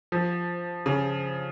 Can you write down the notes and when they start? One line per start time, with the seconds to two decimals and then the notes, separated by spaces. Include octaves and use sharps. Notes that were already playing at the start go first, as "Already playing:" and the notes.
0.12 F3
0.86 C#3